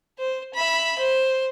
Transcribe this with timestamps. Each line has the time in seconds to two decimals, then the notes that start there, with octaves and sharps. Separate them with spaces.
0.18 C5
0.54 E5 B5
0.99 C5